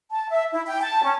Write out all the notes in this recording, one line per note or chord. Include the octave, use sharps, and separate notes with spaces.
A5
E5
E4
G5
A5
C#4